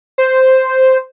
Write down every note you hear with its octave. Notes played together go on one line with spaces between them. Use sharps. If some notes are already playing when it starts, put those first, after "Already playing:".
C5